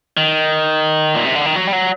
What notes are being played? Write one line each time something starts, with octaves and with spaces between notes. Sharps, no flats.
D#3
A#2
C3
D3
D#3
F#3
G3
F#3